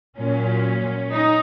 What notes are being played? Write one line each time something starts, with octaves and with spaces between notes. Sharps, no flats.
A#2 F#3 C#4
D#4